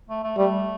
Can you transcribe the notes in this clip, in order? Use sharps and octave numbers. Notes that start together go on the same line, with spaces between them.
A3
A3
G3 A3